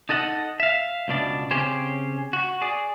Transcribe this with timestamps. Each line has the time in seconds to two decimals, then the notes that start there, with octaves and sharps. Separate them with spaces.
0.09 D#4 A4 D#5 F#5
0.60 E5 F5
1.08 C#2 B2 D4 D5
1.51 C#3 C4 C#4 G4 G#4 C5
2.33 F#4
2.62 G#4 D5